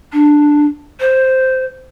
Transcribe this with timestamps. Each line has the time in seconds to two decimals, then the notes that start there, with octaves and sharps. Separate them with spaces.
0.13 D4
1.00 C5